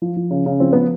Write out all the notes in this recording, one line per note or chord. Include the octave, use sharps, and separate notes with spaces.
F3
F3
C#3
C#3
F3 C4
F3 B3